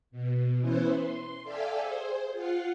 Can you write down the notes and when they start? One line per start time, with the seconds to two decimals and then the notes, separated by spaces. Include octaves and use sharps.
0.11 B2
0.61 E3 B3 C#4 E4 B4 C5
0.95 C6
1.43 A4 D5 E5 F5 G5 G#5
1.82 G#4 C5
2.33 F4 F5 F#5